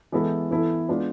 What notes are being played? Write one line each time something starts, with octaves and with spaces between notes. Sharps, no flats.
E3 G#3 B3 E4 A4
E3 B3 E4 A4
G#3 B3 D4 F4